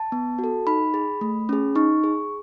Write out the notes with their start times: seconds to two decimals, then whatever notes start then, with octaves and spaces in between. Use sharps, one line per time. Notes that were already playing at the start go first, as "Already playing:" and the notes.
Already playing: A5
0.12 B3
0.39 F#4 A4
0.67 D#4 B5
0.94 G#4
1.21 A3
1.49 C#4 G#4
1.76 D#4 C#6
2.04 G#4